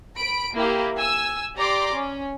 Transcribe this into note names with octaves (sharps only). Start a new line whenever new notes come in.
B5 D7
A#3 E4 G4
G#5 E6
G4 D5 A#5 C6 D6
C#4